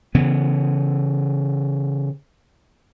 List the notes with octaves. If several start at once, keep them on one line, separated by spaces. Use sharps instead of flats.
C#3 E3 B3